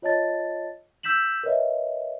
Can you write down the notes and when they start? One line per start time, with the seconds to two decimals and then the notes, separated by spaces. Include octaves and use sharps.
0.02 F4 C#5 D#5 A5 A6
1.03 E6 G6 B6 E7 F#7
1.43 A#4 B4 C#5 D#5 E5